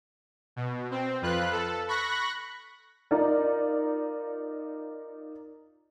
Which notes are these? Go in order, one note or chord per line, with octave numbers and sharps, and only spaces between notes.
B2
C4
F2 F4 B4 F#6
A4
B5 C#6 F#6 A#6
D#4 F4 A#4 D5